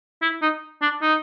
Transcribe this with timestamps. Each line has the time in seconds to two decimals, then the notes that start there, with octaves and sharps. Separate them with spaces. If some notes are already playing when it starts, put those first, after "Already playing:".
0.22 E4
0.42 D#4
0.82 D4
1.02 D#4